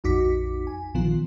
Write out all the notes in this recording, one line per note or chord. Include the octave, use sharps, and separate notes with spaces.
A#1 F2 D#4 F#4 D6 B6
G#5
A#1 A#2 D#3 F3 B3 F4